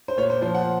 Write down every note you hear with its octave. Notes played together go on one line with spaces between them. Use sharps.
C5
A#2 C#5
C5
F3 C5
F#5